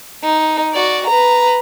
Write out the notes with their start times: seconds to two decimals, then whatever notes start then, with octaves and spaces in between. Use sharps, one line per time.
0.23 D#4
0.73 F#4 D5
1.07 B4 A#5